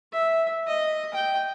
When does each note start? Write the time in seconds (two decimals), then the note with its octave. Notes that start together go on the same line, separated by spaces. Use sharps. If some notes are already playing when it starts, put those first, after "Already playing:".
0.13 E5
0.67 D#5
1.14 G5